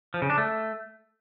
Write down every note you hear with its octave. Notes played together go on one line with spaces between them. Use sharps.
F3
C#3
D4
A3